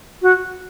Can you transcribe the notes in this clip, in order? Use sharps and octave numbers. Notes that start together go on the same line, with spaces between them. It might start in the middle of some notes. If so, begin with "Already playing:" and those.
F#4